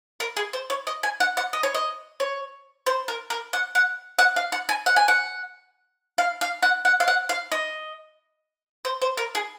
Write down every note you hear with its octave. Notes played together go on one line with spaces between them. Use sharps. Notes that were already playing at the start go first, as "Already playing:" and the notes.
A#4
G#4
C5
C#5
D#5
G#5
F#5
F#5
D#5
C#5
D#5
C#5
C5
A#4
A#4
F#5
F#5
F#5
F5
F#5
G#5
F#5
G#5
F#5
F5
F5
F#5
F#5
F5
F#5
F5
D#5
C5
C5
A#4
G#4